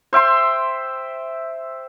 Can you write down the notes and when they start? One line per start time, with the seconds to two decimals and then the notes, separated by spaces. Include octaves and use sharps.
0.13 C5 E5 G5 C6